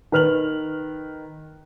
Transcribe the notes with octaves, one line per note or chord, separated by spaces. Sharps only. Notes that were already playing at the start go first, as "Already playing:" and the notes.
D#3 B4 F6 F7 F#7